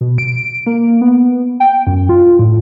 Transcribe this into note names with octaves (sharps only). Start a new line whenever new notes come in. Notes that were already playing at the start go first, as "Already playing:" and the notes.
B2
D7
A#3
B3
G5
F#2
F4
A2